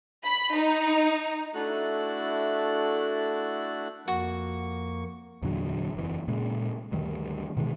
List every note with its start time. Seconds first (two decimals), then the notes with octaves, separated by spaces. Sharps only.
0.26 B5
0.56 D#4
1.54 A3 D4 E4 F#4 A4 F#6
4.08 F2 A#3 F#4 C#6
5.43 E2 A#2 D3 F#3
5.95 F#1 E3
6.28 A#2 C#3 G#3
6.92 D2 G2 D#3
7.57 B2 D#3 E3 G#3